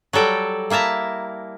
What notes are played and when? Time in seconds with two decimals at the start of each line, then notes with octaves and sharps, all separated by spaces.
0.13 F#3 G3 A4 G5
0.70 A#3 E4 E5 A5 A#5